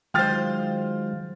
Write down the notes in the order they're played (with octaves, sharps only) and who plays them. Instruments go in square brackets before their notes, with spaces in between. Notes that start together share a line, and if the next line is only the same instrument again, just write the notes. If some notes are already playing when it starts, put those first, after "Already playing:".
[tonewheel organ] D#3 F#3 G#3 [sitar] F4 C5 [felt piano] G5 F6 A6